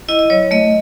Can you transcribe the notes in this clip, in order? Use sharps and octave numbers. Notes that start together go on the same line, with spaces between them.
E4 D#5
D#5
F#3 C#5
A3 D#5